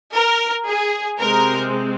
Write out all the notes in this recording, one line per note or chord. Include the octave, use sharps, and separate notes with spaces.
A#4
G#4
C3 G#3 C4 A#4